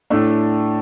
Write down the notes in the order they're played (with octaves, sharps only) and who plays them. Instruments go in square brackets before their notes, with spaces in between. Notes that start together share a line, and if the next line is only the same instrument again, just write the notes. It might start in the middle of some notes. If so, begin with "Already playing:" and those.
[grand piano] A2 A3 D4